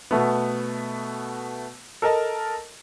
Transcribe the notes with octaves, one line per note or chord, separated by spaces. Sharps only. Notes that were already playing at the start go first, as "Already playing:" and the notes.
B2 A3 B3
A4 A#4 D#5 A5